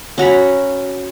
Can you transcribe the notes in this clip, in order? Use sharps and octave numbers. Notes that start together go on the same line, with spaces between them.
C#4 F#4 A#5 B5